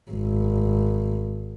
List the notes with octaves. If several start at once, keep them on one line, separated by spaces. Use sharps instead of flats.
G#1